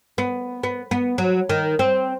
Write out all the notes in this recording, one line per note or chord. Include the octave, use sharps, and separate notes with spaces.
B3
B3
B3
F#3
D#3
C4